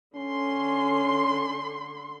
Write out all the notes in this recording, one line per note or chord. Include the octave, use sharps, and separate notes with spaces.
D3 C#4 C6